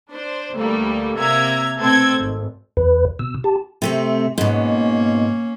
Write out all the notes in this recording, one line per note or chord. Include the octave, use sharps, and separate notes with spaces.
D4 C5
D2 G3 A3 A#3
C3 A#3 E5 A#5 G#6
B2 A3 C4 A4 G#6
G#1
E2 B4
B2 E6
G4 A5
C3 A3 C4
G#2 B2 A#3 C#4